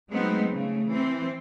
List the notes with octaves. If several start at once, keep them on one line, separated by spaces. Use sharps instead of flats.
F#3 G#3 A3 B3 C4 D#4
C#3 A3
E3 C4